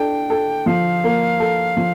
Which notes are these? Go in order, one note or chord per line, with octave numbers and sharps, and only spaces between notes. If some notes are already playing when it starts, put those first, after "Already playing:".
Already playing: D4 A4 G5
A4
F3 F5
A#3
A4
F3